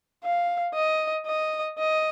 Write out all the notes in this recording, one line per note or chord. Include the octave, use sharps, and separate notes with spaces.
F5
D#5
D#5
D#5